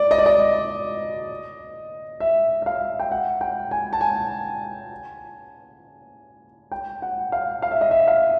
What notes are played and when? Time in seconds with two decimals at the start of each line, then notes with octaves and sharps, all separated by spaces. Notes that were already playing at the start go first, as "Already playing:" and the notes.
Already playing: D5
0.11 D#5
0.18 D5
0.26 D#5
2.20 E5
2.62 E5
2.66 F5
3.00 G5
3.12 F#5
3.41 G5
3.71 G#5
3.93 A5
4.01 G#5
6.72 G5
7.02 F#5
7.32 F5
7.62 F5
7.71 E5
7.81 D#5
7.91 E5
8.08 F5